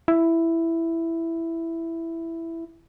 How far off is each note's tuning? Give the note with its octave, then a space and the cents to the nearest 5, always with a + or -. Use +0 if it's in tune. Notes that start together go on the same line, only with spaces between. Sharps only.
E4 +5